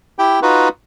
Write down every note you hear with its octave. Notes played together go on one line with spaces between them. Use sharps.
E4 G4 G5
D#4 F4 F#4 B4